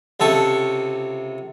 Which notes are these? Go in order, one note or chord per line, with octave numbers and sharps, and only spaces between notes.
C#2 C3 A4 C#6